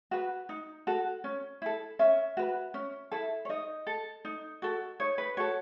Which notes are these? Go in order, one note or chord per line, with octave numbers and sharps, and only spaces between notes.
F#4 B4
D#4
F#4 A4
C#4
E4 A4
C#4 E5
F#4 B4
C#4
E4 A4
C#5
D#4 D#5
A4
D#4
F#4 A4
D#4 C#5
B4
F#4 A4 C#5